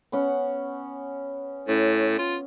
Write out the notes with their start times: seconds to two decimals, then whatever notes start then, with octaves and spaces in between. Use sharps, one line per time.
0.12 B3 C#4 F#5
1.68 A2 C#4
2.19 F4